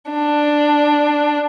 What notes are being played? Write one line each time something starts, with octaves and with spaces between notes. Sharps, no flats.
D4